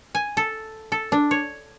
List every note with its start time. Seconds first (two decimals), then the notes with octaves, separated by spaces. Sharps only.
0.15 G#5
0.37 A4
0.92 A4
1.12 D4
1.31 C#5